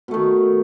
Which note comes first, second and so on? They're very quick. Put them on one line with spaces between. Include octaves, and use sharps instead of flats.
B2 A3 D#3